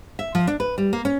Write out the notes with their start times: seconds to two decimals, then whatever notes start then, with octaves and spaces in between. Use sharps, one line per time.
0.19 E5
0.35 F3
0.47 D4
0.60 B4
0.78 G3
0.93 A#3
1.05 C#4